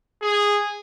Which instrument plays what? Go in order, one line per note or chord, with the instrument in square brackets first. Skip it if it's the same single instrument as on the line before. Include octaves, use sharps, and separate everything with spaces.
[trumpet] G#4